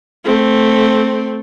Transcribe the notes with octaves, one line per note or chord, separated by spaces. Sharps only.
A3 C4